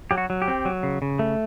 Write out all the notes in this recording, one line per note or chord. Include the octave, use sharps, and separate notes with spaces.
F#3 G4
F#4
F#3
G4
C4
F#3
C#3
C#3
A3